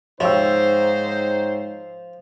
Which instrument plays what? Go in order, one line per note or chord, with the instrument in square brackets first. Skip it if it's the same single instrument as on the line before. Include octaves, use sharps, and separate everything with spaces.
[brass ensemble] G#2 D#4 C5 [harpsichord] F3 [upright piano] C#5 G5 E6